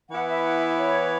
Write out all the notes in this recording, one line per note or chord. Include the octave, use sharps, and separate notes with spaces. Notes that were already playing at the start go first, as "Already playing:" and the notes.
E3 B3 E4 F#5
E5
F#5
E5
C#5